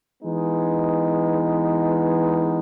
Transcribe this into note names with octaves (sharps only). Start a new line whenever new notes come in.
E3 G#3 B3 D#4